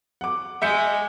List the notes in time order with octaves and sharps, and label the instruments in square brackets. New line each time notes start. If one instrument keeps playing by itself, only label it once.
[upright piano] F#5 D6
[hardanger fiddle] G#3 [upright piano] E5 G6 C#7